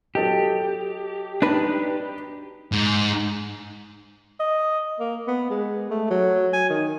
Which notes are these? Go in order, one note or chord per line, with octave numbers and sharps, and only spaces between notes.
F#3 G4 A4 D#5
D4 D#4 B4
G#2
D#5
A#3
B3
G#3
A3
F#3
G#5
D#3